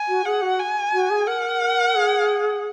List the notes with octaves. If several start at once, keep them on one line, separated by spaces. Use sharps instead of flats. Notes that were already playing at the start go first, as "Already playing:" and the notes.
Already playing: G#5
F#4
G#4 F#5
F#4
G#5
F#4
G#4
A#4 F#5
G#4